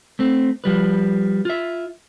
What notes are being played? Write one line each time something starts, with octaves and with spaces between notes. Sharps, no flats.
A3 C4
F3 G3 B4
F4 E5